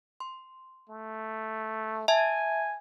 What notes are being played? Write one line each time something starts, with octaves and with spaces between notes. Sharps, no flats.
C6
A3
E5 G#5 A5 G#6